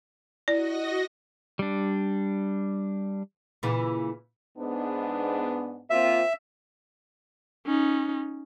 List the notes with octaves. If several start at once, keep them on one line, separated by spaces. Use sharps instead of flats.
E4 F#4 D5 D#5 A#6
G3 D4
A#2 C#3 E3
G#2 B3 D4
A#3 C4 F4 E5
C#4 D#4